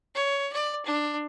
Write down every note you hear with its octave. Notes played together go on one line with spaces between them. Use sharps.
C#5
D5
D4